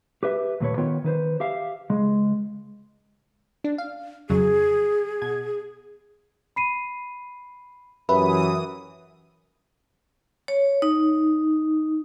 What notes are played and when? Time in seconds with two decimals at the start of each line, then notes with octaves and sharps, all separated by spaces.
0.23 G4 B4 E5
0.60 D#2 A#2 A3 B4 C#5
0.77 D#3 B3 F4 C#5 G5
1.04 D#3 B4 C5
1.40 G4 E5 F5
1.90 C#2 G#3
3.64 D4
3.78 F5
4.30 F2 C#3 F#3 G#4
5.22 B2 G#6
6.56 B5 C7 D#7
8.09 F#2 E3 G4 B4 E5 B5 D#6
10.48 C#5
10.82 D#4